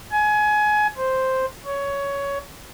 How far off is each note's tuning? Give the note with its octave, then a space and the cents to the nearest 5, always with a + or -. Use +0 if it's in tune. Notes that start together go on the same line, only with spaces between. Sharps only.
G#5 +25
C5 +0
C#5 +15